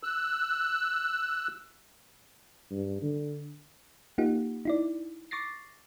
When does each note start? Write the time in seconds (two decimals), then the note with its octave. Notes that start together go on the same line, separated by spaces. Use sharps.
0.03 E6 F#6
2.71 G2
3.02 D3
4.18 A#3 D#4 F4 G4 F#5
4.65 D#4 E4 D5
5.31 C#6 D6 A6 A#6 C7